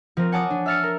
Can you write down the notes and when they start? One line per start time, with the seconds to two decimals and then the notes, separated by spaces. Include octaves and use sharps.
0.17 F3 C4 A#4
0.32 C#5 F#5 G#5 A5 D6 D#6
0.50 D4
0.66 E5 E6 F6 A6 C#7
0.83 A#4